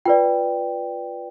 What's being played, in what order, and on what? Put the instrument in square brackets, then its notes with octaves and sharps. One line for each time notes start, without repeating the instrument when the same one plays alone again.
[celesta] F4 B4 D5 G5